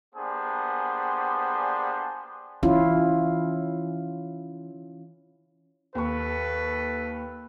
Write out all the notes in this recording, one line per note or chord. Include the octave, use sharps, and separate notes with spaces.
A#3 B3 D4 G4 G#4 C5
E3 C#4 E4 F4
D#2 A4 B4 C#6